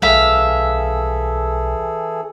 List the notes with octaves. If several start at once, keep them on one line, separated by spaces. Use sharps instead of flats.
B1 E3 G3 G#4 A4 E5 F5